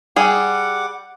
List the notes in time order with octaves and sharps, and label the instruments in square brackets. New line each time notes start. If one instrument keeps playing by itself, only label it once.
[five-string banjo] G3 G#4 [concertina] F#5 D6